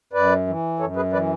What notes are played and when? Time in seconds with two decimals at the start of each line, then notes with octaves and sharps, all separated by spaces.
0.13 F#2 B4 D5
0.47 E3
0.79 F#2 A4 C#5
0.96 G#4 B4
1.13 E3 B4 D5